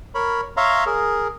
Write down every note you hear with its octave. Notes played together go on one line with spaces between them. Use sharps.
A#4 C#5 B5
C#5 E5 F5 A#5 C6
G#4 A#4